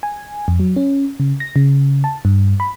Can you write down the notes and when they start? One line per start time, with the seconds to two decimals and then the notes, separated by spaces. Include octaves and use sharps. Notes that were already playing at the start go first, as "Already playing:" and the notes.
0.03 G#5
0.48 F2
0.60 F#3
0.77 C#4
1.20 C#3
1.40 A#6
1.56 C#3
2.04 A5
2.25 G2
2.60 B5